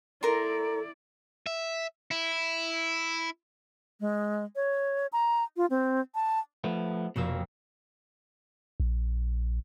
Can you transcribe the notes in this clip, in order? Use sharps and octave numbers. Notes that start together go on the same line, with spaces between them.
E4 A4 A#4 D5 A#5 C6
E5
E4
G#3
C#5
A#5
F4
C4
A5
F3 A3 B3
F1 F2 B2 A#3 E6
A#1